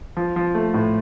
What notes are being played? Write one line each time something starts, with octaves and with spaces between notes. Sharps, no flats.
F3
F3
A3
A2